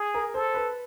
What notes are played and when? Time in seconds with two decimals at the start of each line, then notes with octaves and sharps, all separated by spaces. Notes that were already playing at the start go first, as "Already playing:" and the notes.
Already playing: G#4
0.14 A#4
0.34 A4 C5
0.54 B4